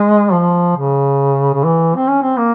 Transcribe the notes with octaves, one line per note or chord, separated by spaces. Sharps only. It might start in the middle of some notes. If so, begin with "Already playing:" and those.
Already playing: G#3
F3
C#3
C#3
E3
C4
C#4
C4
A#3